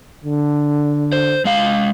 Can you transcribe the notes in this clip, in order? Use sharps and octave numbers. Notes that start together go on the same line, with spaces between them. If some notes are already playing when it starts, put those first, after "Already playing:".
D3
C5
G#3 F5